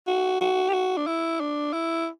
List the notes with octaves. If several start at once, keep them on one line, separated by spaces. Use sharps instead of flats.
F#4
F#4
G4
F#4
D4
E4
D4
E4